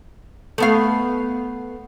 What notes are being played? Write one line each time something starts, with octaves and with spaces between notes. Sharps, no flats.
A3 B3 F5